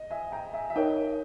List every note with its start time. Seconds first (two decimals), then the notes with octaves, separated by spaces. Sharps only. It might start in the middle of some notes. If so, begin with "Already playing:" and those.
Already playing: D#5
0.10 E5 G#5
0.32 G5 A#5
0.54 E5 G#5
0.70 E5
0.75 D#4 A#4 C#5 D#5 G5